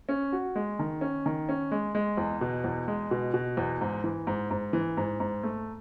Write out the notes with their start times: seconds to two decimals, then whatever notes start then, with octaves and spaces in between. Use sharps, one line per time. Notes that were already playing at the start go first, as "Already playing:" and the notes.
0.09 C#4
0.32 F#4
0.56 G#3
0.79 D#3
1.01 C#4
1.26 D#3
1.49 C#4
1.71 G#3
1.95 G#3
2.17 E2
2.41 B2
2.64 E2
2.88 G#3
3.11 B2
3.34 B2
3.57 E2
3.81 G#2
4.04 E3
4.27 G#2
4.51 G#2
4.73 E3
4.97 G#2
5.20 G#2
5.43 A3